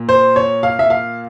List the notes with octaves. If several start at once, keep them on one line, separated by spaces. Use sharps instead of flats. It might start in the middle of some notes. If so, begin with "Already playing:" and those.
Already playing: A#2
C5
C#5
F5
E5
F5